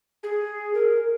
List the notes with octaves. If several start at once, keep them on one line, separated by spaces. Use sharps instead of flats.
G#4
A#4